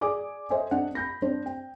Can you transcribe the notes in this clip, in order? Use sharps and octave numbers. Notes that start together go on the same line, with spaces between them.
G#4 D5 G#5 D6 D#6
A4 C5 D#5 E5 G#5
C4 D4 D5 F#5
B5 G6 A#6
C4 D4 C5 D5
G5